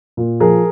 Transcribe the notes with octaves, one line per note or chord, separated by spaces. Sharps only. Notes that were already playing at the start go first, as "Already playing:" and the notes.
A#2
F3 G#4 A#4